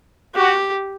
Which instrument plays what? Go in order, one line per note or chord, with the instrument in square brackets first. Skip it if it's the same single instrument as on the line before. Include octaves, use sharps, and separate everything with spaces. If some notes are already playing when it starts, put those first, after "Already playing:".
[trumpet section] F#4 [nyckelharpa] G4